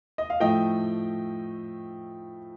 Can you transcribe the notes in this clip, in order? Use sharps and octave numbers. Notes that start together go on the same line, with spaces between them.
D#5
F5
A2 F3 A3 D#5 G5